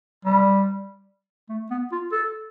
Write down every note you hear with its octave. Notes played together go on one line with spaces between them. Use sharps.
G3
A3
B3
F4
A4